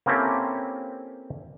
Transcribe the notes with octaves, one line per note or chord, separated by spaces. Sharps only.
A#3 C4 C#4 E4 G4 A4